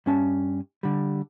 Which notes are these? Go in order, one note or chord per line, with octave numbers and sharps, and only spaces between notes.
G2 C#4 A5
D3 G3